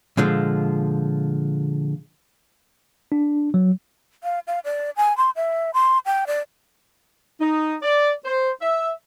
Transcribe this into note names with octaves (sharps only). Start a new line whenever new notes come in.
A#2 D3 F3 G#3
D4
F#3
F5
F5
D5
G#5
C6
E5
C6
G5
D5
D#4
D5
C5
E5